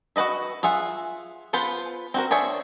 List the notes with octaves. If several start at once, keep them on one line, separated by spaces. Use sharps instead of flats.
F#4 G#4 B4 D#5 E5
F4 G#4 E5 F#5
B3 F4 B4 C5
C4 F#4 A#4
D4 G#4 C5 C#5 E5